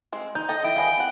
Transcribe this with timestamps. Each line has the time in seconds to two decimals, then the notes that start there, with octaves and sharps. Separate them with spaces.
0.12 G#3 C4
0.35 D#4 G6
0.49 A4 D#5 G5
0.64 E4 E5 G5
0.76 G#4 B4 D#5 F5 G#5
0.97 C4 F#5